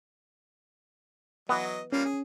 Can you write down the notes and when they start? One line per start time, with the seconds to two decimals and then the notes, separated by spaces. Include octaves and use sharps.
1.49 E3 F#3 B3 D#5
1.92 G3 A#3 C#4 F4
2.05 G#4